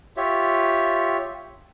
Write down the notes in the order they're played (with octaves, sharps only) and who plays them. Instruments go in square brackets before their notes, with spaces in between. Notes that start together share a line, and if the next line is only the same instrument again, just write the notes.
[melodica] F4 G4 C#5 E5